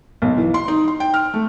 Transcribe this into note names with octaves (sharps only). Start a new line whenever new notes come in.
B1
E3
C6
D#4
C6
G5
F6
A3